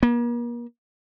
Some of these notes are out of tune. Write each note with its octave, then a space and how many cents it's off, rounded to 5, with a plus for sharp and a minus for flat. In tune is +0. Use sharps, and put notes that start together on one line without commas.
A#3 +40